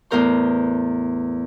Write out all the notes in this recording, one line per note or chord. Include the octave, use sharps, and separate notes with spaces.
E2 A2 B3 A#4 C5 C6